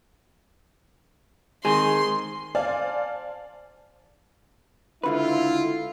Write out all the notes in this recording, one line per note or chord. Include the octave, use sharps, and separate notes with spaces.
D#3 G#3 C4 G#4 C6
C5 D5 F5 G#5 A5
C#2 D3 E4 F4 B4